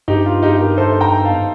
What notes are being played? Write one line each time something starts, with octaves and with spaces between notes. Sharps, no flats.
G2 D#4 G4
F4
D#4 G4
G4 A#4
A4 C5
G5 A#5
F5 A5